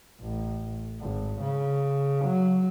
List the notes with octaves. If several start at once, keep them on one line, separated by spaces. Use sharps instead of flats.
A1
G#1
C#3
F#3